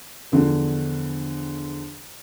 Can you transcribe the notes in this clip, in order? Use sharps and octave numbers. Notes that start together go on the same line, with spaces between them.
E2 D3 F3